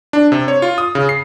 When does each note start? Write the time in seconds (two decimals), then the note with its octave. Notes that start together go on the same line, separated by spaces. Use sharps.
0.13 D4
0.32 C3
0.48 C#5
0.62 F4
0.78 D#6
0.95 C#3
1.09 C7